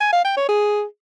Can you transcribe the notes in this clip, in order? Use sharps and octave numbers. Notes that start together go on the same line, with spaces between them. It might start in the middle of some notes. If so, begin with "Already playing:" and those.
G#5
F5
G5
C#5
G#4